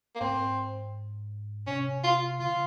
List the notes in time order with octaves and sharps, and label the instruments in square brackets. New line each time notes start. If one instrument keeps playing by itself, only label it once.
[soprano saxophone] A#3
[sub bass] G#2 [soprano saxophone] C4
[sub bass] C3 [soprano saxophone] C#4
[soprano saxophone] F4
[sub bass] C#3 [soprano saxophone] F4